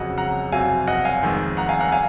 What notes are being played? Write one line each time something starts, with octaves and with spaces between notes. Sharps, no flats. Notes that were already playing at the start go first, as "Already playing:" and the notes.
Already playing: F2 C#3 F#3 D#5 F#5
F#5 A#5
F2 C3 F#3 F5 G#5
D#5 F#5
F5 G#5
F2 D#3 G#3
F#5 A#5
F5 G#5
F#5 A#5
F5 G#5